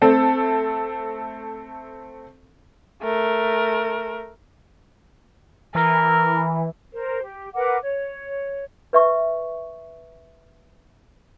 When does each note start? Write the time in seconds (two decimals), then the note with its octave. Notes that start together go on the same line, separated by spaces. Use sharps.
0.02 A3 C4 A4
3.03 A3 A#4
5.75 E3 A#4
6.93 A#4 C5
7.23 G4
7.54 A#4 B4 F#5 D6
7.82 C#5
8.93 B4 E5 C#6